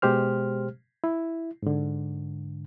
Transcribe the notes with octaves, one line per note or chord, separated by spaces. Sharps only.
B2 G#3 G4 C5 F6
E4
G#2 D3